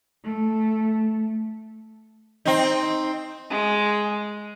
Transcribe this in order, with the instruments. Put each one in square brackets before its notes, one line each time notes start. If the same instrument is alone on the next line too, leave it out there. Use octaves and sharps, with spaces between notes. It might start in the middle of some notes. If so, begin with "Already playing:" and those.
[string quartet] A3
[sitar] C4 D#4
[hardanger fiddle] G#3